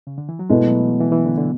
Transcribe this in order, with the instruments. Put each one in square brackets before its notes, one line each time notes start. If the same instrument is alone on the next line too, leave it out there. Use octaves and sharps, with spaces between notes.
[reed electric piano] C#3
D3
E3
F#3
[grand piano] B2 A3 E4 B4 [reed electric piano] G#3
[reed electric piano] F#3
E3
E3
E3
D3
D3